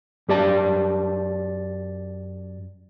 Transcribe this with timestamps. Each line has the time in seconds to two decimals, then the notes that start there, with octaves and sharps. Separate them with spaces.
0.29 F#2 G4 D5 A5